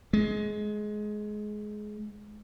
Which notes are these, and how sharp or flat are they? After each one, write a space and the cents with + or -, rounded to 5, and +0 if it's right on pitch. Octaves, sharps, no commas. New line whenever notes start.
G#3 +20